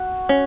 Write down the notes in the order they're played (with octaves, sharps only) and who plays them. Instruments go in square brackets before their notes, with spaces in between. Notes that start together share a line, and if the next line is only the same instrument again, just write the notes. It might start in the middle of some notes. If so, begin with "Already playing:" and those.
Already playing: [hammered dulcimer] F#4
[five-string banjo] C#4